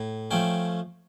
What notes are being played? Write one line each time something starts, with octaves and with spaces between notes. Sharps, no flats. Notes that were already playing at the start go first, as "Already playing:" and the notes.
Already playing: A2
F3 A3 C#4 G5